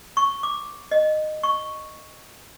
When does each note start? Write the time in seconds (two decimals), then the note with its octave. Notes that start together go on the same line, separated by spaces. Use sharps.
0.17 C#6
0.43 D6
0.91 D#5
1.43 C#6